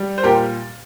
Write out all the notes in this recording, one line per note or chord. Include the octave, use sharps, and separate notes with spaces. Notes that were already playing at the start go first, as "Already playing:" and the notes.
Already playing: G3
C5
A#2 G4 A#4